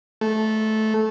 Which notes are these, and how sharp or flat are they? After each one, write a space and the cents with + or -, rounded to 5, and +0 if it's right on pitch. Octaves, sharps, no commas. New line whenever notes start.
A3 -15